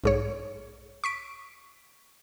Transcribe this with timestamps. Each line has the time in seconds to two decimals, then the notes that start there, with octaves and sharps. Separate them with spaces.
0.04 B1 G#2 C#5
1.04 C#6 B6 D7